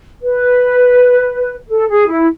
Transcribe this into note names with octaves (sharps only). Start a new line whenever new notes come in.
B4
A4
G#4
E4